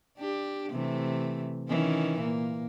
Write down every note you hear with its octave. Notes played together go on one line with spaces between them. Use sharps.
D4 G4
C3 E3 A3
D#3 E3 C#4
A#2 A#3